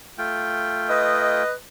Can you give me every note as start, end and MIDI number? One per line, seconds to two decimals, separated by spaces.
0.18 1.43 57
0.18 1.43 65
0.18 1.43 79
0.88 1.51 71
0.88 1.51 75